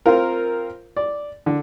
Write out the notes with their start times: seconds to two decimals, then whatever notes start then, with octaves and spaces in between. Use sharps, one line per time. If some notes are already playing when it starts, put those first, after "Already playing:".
0.06 C4 F4 A#4
0.97 D5
1.46 D3